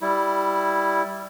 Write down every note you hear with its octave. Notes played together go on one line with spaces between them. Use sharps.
G3 E4